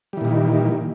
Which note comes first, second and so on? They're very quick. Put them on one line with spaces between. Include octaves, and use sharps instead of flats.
G3 E3 A#2 D#3